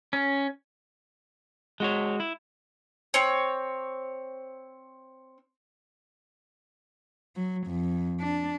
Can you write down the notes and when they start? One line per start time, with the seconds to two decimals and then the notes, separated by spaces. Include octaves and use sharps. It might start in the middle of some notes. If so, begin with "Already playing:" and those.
0.13 C#4
1.80 G#3 F#4 C#5
2.20 E4
3.14 C4 C#5
7.36 F#3
7.67 F2
8.20 D4